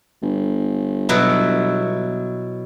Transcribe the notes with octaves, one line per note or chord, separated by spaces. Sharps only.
G1
B2 F#3 E4